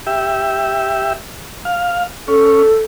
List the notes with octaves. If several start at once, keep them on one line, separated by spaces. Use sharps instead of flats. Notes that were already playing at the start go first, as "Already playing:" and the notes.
G4 E5
F5
C#4 A4